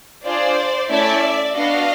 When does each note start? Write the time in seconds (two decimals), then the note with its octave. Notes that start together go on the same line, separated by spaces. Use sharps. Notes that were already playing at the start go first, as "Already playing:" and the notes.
0.23 D4 F4 G#4 C5 D5
0.89 A3 C#4 E4 A4 D5 E5
1.55 B3 D4 F#4 D#5 F5